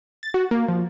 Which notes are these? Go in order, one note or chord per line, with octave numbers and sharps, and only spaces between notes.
A6
F#4
A#3
F3